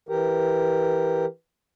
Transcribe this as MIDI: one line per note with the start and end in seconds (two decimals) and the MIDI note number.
0.09 1.26 52
0.09 1.26 67
0.09 1.26 70